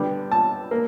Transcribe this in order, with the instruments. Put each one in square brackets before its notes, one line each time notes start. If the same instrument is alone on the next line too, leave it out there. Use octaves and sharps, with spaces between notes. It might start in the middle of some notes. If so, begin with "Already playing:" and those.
Already playing: [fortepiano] D3 G3 B3
A5
A#3